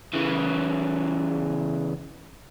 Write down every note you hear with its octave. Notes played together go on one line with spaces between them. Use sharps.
C#3 E3